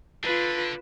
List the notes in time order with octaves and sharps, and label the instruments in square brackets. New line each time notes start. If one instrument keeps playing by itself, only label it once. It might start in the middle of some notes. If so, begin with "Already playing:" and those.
[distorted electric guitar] D3 [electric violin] F4 B4